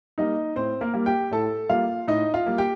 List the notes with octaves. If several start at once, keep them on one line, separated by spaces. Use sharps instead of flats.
G3 A#3 D#4 D#5
A2 C4 C5
A#3 A#4
G3 A#3
G4 G5
A2 A4 A5
G3 A#3 F4 F5
A2 D#4 D#5
F4 F5
G3 A#3
G4 G5